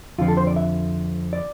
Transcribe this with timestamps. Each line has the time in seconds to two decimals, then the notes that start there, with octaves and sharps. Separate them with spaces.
0.18 F2 D3 F3 F4
0.28 A4
0.37 C5
0.47 D5
0.56 E5
1.33 D5